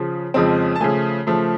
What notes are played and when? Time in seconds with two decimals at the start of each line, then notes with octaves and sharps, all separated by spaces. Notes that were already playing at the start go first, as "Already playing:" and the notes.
Already playing: C#3 F3
0.34 F2 C#3 F3 G#3 C4
0.76 A5
0.80 C#3 F3 A3 G#5
1.27 C#3 F3 A3